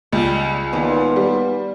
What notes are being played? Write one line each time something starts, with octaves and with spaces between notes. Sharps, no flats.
C#2 G3
D#2 A#2 B3
G3